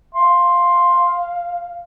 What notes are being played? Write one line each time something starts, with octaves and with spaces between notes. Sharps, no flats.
F5 C6